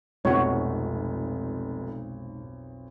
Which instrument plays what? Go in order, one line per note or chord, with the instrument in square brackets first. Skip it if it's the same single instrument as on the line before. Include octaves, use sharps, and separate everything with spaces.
[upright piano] F1 [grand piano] B1 F2 [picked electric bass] G#2 C3 [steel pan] F#4 C#5